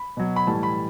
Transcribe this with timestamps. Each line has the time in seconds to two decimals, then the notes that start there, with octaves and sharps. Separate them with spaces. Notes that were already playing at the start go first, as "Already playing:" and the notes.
Already playing: B5
0.17 B2 F#3
0.36 B5
0.47 A2 E3 G3 A5
0.63 B5